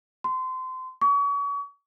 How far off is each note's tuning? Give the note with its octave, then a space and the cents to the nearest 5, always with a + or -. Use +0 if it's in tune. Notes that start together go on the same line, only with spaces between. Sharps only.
C6 -25
C#6 +35